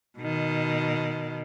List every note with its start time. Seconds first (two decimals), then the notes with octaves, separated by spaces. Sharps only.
0.19 B2 D#3